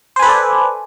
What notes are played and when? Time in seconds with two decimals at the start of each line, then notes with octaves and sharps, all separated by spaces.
0.16 C5
0.19 G#5
0.22 B4
0.26 A4
0.29 D5